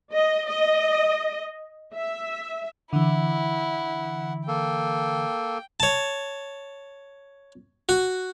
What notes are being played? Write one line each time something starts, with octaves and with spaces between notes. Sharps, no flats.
D#5
D#5
E5
D3 E3 E4 F#5
A#3 A4 G5
C#5 A5
F#4